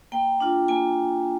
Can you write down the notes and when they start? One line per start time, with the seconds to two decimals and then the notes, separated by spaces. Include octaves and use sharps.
0.12 A#3 G5
0.40 D4 F4
0.68 A#3 G#5